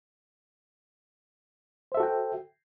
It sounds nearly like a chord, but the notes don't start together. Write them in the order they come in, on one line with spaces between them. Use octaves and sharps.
C5 E5 A4 F#4 G5